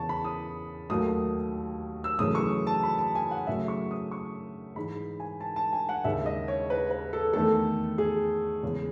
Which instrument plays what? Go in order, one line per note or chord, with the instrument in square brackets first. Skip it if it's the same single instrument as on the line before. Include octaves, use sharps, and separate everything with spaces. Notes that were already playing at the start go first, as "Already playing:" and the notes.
Already playing: [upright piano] E2 C#3 E3 A5 C#6
B5
D#6
D#2 D#3 F#3 A3 D#6
E6
F#2 C#3 E3 A3 D#6
C#6
A5
B5
A5
G#5
F#5
F#2 C#3 F#3 A3 E5
C#6
D#6
C#6
G#2 E3 G#3 B5
G#5
A5
A5
G#5
F#5
D#2 C#3 G#3 E5
D#5
C#5
B4
B4
A4
E2 D#3 A3 A4
G#4
E2 C#3 G#3